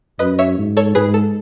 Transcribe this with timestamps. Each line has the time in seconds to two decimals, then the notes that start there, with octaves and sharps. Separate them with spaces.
0.19 F#2 B4 D#5
0.39 C#5 E5
0.58 G#2
0.77 A4 C#5
0.95 G#2 G#4 B4
1.14 A4